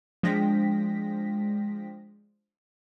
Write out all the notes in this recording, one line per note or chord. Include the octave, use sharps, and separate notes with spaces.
F3 G#3 D4 G5 A#6 B6